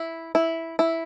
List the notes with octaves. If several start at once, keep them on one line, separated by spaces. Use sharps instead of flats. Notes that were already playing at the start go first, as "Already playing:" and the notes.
Already playing: E4
E4
E4